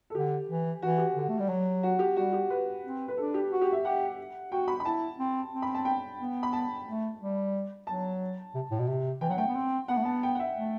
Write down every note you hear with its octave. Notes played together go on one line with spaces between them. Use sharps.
A4
D3 G4
E3
E3 F#4
G4
D3
A3
G3
F#3
F#4
G4
G3 F#4
G4
B4
C4
B4
D4 A4
G4
F#4
G4
E5
G4 F#5
F#4 G5
B5
B5
E4 A5
C4
C4
B5
A5
G5
B3
B5
A5
A3
G3
F#3 A5
C3
A2
B2
C3
E3 G5
F#3 F#5
A3 G5
B3
C4
B3 F#5
A3
B3 A5
G5
F#5
E5
A3